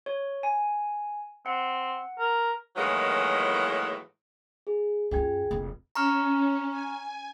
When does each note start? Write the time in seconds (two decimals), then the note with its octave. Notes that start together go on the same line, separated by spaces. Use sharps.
0.06 C#5
0.43 G#5
1.46 C4 F#5
2.19 A#4
2.76 A2 D#3 E3 F#3 G#3 A#3
4.67 G#4
5.11 F#2 F4 G#4 G5 G#6
5.51 F1 E4
5.95 C#4 A#5 C#6 F6
6.69 G#5